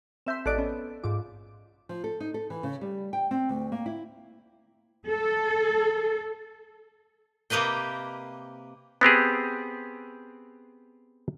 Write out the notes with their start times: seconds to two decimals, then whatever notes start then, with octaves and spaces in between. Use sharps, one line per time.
0.26 C4 E5 C6 G6 E7
0.46 A1 A4 D5 D#5 F#6 D7
0.58 B3 C#4
1.04 G#2 F4 D6
1.89 F3
2.04 A4
2.20 D#4
2.34 A4
2.50 E3
2.63 C#3
2.81 G3
3.13 G5
3.31 C4
3.49 D2
3.72 A#3
3.86 E4
5.09 A4
7.50 C3 A#3 G4 B4 D#5 G5
9.01 B3 C4 G4 G#4